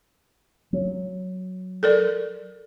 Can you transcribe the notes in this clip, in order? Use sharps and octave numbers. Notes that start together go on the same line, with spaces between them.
F#3
A4 A#4 D5